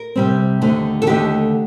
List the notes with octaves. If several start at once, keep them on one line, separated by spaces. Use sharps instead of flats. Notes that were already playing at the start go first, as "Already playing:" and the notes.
Already playing: A#4
C3 G3 C4
D#2 D3 A3 D#4
A4
D#2 D3 A3 D#4 G4